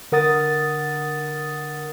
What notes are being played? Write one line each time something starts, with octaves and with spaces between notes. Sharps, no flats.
D3 A#4 F#5 D#6 A6